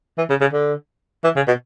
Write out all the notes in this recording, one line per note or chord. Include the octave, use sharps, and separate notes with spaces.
E3
C#3
C#3
D3
E3
C#3
B2